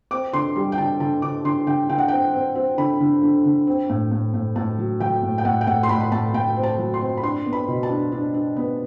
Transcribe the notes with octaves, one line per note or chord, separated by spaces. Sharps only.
C4 D6
D3 C6
G3 C6
G5
D3 A5
D3 A5
D3 D6
D3 C6
D3 G5
D3 G5
F#5
C4 G5
C4
C4
D3 B5
D3
D3
D3
C4
A2
A2
A2
A2 A5
F#3
F#3 G5
A2
G5
A2 F#5
G5
A2 F#5
C6
A2 B5
B5
A2 A5
A2 G5
C4
A5
F#3
C6
C4
B5
D4 C6
B3
B5
B2
A5
D4
D4
D4
B3